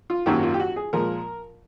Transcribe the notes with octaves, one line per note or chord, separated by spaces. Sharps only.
F4
G#1 F#2 D#3 F#3 A#3 G4
F4
G4
F#4
G#4
A#2 F3 G#3 A#4